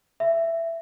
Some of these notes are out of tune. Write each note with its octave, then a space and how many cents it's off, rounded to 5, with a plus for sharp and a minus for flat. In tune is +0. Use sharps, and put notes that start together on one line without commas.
E5 +15